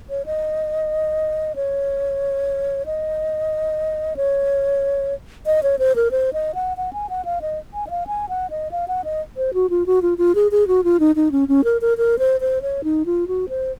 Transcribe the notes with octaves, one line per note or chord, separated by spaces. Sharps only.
C#5
D#5
C#5
D#5
C#5
D#5
C#5
C5
A#4
C5
D#5
F#5
F#5
G#5
F#5
F5
D#5
G#5
D#5
F5
G#5
F#5
D#5
F5
F#5
D#5
C5
F#4
F4
F#4
F4
F4
G#4
G#4
F#4
F4
D#4
D#4
C#4
C#4
A#4
A#4
A#4
C5
C5
C#5
D#4
F4
F#4
C5